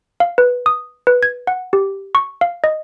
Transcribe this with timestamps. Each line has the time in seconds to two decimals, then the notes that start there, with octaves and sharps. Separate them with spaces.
0.20 F5
0.38 B4
0.66 D#6
1.07 B4
1.23 G#6
1.47 F#5
1.73 G4
2.15 C#6
2.41 F5
2.64 D#5